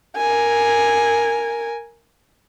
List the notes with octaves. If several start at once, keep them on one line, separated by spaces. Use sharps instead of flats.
A#4 G#5